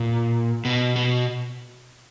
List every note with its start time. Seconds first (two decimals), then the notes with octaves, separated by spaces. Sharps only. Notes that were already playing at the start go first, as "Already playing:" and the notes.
Already playing: A#2
0.65 B2
0.96 B2